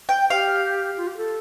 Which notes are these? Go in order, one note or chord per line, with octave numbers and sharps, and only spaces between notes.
G5
G4 F5
F4
G4
A4